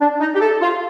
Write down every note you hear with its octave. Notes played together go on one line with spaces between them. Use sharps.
D4
D#4
G4
A4
F4